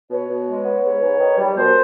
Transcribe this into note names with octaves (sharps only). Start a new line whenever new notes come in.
B2 B4 C#5
B2
G#3
B3
G#2
G#2
D#3
G3
B2 A#4 C5